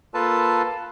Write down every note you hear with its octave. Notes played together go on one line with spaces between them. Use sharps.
A#3 F4 A4 B4 A5